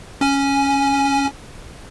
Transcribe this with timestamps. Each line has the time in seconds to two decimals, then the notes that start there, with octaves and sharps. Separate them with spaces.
0.21 C#4 G#5